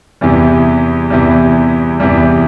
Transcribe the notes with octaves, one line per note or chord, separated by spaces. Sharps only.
E2 C3 E3 G3
E2 C3 E3 G3
E2 C3 E3 G3